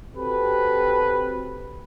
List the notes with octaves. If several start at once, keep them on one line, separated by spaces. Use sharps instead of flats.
C4 F#4 G4 A4 B4